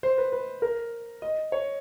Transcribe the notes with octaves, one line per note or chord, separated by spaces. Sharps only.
C5
B4
B4
A#4
D#5
C#5